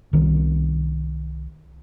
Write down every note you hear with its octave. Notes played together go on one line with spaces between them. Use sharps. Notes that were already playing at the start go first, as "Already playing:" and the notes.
C2 D#3